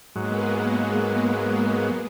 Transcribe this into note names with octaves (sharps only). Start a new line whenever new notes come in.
G#2 F#3 G#3 A#3 B3